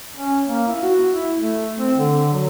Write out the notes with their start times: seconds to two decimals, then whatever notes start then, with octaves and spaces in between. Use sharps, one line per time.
0.16 C#4
0.47 A#3
0.67 E4
0.82 F#4
1.12 E4
1.36 A3
1.79 C4
1.96 D3
2.33 F#3